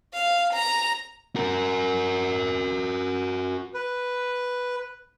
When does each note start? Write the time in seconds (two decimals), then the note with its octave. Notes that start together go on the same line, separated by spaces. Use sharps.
0.14 F5
0.53 A#5
1.36 F#4 A#4
3.74 B4